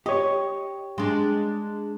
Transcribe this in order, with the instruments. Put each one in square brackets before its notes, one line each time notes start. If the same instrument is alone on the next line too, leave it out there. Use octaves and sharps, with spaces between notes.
[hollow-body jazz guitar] G4 C#5 [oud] D#5
[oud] G#3 D4